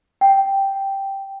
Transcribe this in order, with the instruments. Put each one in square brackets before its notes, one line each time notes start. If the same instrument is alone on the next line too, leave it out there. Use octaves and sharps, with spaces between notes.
[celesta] G5